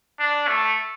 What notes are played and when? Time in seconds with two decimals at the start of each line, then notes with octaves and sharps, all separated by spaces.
0.20 D4
0.48 A3